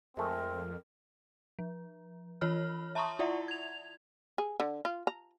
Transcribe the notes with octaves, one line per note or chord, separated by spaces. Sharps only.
F2 G#3 A3 C4 A#4
F3
E3 F4 C#5 B5 F6
E5 A5 A#5 C6 C#6 D#6
E4 F4 D5 E5 F#5
G#6 F7
G#4
D3
F4
A#5